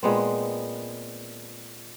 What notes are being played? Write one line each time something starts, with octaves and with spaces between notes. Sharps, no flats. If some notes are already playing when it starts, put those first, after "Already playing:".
A#2 G#3 B3 C4